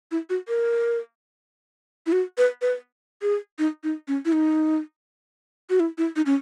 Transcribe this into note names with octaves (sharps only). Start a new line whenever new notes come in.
E4
F#4
A#4
E4
F#4
B4
B4
G#4
D#4
D#4
C#4
E4
D#4
F#4
E4
E4
D#4
C#4